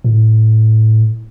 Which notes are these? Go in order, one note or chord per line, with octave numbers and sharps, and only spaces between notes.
A2